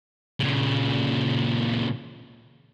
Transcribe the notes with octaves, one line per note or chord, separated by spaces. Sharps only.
A#2 C#3